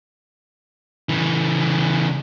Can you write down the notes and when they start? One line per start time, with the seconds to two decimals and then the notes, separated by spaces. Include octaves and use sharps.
1.09 C#3 E3